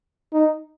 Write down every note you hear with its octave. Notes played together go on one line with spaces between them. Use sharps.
D#4